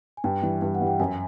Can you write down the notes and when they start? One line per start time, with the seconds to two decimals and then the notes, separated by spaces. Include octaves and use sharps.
0.17 G#5
0.24 G2 G5
0.42 E3 G3
0.62 G2
0.75 F#5
0.81 E3 G3
0.87 G5
1.00 F#2 G#5